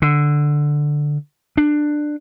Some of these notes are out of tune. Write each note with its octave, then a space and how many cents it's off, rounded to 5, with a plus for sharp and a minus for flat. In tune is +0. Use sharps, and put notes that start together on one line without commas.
D3 +5
D4 +15